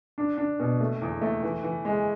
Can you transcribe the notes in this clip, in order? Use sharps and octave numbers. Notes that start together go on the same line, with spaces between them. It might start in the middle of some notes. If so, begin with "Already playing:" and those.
D4
D4
B2
A3
E2
A3
E3
E3
G#3